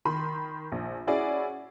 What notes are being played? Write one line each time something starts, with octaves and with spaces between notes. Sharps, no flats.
D#3 B5 C6
A#1
C#4 E4 F#4 G#4 D5